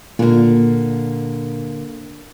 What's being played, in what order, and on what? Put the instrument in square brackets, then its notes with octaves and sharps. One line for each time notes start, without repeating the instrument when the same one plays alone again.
[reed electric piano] A#2 [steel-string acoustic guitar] D3 A#3